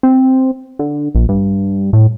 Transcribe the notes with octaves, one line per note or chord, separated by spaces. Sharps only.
C4
D3
A#1
G2
A2